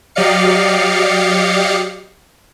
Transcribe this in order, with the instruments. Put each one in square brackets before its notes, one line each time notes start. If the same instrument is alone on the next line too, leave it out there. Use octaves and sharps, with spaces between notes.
[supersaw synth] F#3 G4 D5 D#5 F5 C#7